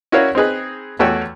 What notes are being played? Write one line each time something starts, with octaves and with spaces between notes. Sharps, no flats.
C#4 E4 F#4 A#4 C#5 F5
C4 D#4 G#4 B4
E2 A3 F#4 C#5 G5